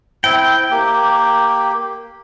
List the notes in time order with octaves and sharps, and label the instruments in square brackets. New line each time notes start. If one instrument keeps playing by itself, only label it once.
[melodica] C4 E4 [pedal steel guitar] G5
[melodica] A#3 G4